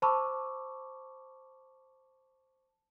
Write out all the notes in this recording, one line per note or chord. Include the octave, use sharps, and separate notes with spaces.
C5 A5 B5 C#6 D6 E6